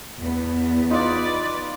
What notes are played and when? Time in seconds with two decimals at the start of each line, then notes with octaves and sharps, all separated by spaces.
0.19 E2 B3
0.90 D#4 F4 B4 D5